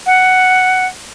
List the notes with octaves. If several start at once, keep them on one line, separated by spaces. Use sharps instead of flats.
F#5